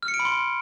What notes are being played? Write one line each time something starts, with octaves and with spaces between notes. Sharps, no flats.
F6
C#7
D7
B5
C6